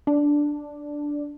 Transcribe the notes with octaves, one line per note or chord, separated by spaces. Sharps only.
D4